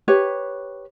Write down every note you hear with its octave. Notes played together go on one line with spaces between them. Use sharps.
G4 B4 C#5